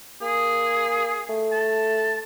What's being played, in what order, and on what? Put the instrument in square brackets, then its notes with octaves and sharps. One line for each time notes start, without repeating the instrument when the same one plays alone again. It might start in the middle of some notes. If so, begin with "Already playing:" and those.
[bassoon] A#3 [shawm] G#4
[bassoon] A3
[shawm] A5